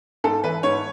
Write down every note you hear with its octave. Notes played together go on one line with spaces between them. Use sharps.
G#2 A4
E3 B4
G#2 C#5